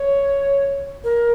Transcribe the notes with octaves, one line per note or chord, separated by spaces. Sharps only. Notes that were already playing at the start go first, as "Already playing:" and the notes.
Already playing: C#5
A#4